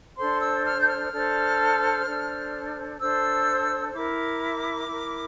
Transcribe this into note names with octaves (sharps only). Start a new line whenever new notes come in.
D4 A4 C5 C6
E6
F6
G6
F6
D4 A4 C5
D4 A4 C5
D4 A4 C5 E6
E4 A#4 D6
E4 A#4